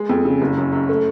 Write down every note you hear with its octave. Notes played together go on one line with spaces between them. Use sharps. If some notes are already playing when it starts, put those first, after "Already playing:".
Already playing: G#3
F2
C#3
F#1
F#2
F#2
A3